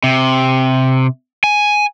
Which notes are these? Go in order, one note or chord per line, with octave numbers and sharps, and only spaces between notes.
C3
G#5